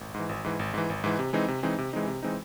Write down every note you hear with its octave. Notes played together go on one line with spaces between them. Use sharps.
G#1
G#2
E3
G#1
G#2 E3
G#1
G#2 E3
G#1
G#2 E3
C3
E3 G#3 C4 D#4
C3
E3 G#3 C4 D#4
C3
E3 G#3 C4 D#4
C3
E3 G#3 C4 D#4